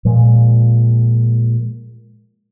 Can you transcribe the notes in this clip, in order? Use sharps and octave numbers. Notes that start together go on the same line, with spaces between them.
A#2 F3 G#3